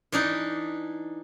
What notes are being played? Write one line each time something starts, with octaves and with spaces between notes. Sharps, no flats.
E3 D4 D#4